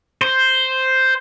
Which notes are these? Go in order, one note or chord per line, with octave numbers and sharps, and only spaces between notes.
C5